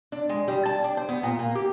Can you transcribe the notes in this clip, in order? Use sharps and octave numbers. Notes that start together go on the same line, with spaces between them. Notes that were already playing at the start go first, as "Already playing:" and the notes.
D4
G#3
G3
A5
D4
C5
B3
A#2
A#3
G4